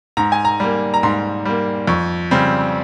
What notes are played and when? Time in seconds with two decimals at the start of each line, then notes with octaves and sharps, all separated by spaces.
0.17 G#2 A#5
0.32 G#5
0.45 A#5
0.60 G3 A#3
0.94 A#5
1.03 G#2 C6
1.45 G3 A#3
1.87 F2 C#6
2.31 C#3 G3 C4